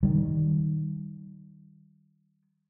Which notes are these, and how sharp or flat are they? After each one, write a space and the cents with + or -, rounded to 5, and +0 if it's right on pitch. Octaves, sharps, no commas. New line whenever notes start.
D#3 +0 G3 -20